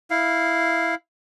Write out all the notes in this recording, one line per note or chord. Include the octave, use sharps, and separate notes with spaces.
E4 F5